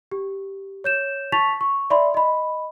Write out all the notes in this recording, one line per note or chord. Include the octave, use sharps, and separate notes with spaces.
G4
C#5 G6 E7
A5 C#6 A6 B6 F7
C#6
D5 E5 B5 C6
D#5 B5